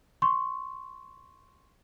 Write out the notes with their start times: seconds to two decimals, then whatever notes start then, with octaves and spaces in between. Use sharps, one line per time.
0.22 C6 C#6